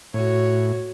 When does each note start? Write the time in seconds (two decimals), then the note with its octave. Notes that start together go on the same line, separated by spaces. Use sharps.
0.14 A2 F#4 C#5